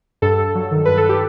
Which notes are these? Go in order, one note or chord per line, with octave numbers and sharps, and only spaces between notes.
G2 A4
G2
F#3
D#3
G2 B4
A4
G4